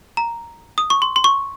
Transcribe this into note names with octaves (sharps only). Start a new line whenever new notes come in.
A#5
D#6
C#6
C6
C6
C#6